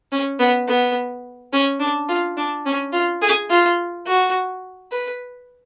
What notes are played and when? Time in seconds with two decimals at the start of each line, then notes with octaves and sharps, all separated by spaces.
0.12 C#4
0.39 B3
0.68 B3
1.53 C#4
1.80 D4
2.09 F4
2.37 D4
2.66 C#4
2.93 F4
3.22 G#4
3.50 F4
4.07 F#4
4.92 B4